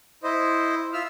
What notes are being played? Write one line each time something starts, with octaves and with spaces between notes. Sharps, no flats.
E4 C5 D#5
F4 E5 E6 F6